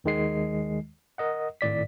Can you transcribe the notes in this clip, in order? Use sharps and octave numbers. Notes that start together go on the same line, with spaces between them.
D#2 D#3 G#3 C7
A#4 D#5 F#5
G#1 A2 D5 B6